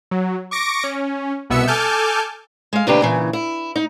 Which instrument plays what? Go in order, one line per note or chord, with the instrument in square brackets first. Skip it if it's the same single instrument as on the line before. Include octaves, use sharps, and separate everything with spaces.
[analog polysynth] F#3
C#6 D6 A#6 C#7 D7
C#4
C2 B2 B3 E5 E6 C#7
A4 G#5 A5 D6 F6 G6
[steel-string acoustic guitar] G#3 F5
D#2 C3 D4 G4 B4
A#2 C#3 E3
E4
D#4